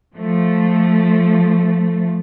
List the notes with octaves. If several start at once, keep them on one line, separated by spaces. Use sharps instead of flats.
F3 A3